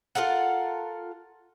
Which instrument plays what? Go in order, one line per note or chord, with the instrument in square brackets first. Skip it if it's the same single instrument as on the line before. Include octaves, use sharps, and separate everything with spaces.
[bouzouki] F4 A4 A#4 F#5